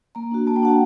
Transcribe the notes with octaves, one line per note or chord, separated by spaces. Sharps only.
A#3 A#5
D4 F#4
A#3 A5
G5
D4 F#4 F#5